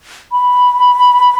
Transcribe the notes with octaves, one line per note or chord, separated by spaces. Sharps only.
B5